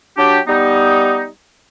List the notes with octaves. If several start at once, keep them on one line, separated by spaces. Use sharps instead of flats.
F#3 D4 G4
G3 B3 D#4